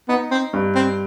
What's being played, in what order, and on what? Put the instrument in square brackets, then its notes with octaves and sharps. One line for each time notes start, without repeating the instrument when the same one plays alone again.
[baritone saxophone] B3 [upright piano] D#4
[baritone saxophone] C4
[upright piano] G2
[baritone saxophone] C4